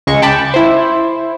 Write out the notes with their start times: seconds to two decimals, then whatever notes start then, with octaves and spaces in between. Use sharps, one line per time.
0.07 C#2 G#3 C#6
0.22 G5 A5 B5 D6
0.54 E4 C5